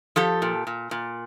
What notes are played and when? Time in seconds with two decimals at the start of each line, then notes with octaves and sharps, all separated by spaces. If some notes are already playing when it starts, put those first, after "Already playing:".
0.16 F3 G4 A4
0.42 A#2
0.67 A#2
0.91 A#2